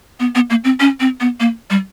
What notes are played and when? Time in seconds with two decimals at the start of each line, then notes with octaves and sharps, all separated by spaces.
0.20 B3
0.35 B3
0.50 A#3
0.64 C4
0.80 C#4
1.00 C4
1.20 B3
1.40 A#3
1.70 G3